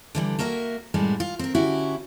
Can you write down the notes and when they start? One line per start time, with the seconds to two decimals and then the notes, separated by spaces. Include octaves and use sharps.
0.15 D3 E3 G3
0.39 A#3 F#4 A#4 E5
0.94 F#2 A2 G3 G#3 B3
1.20 F4
1.39 C4 A#4
1.55 D3 C#4 E4 F#4 G4